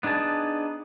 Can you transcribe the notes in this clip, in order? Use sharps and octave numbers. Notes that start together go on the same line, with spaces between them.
B3 D4 D#4 G#4 A5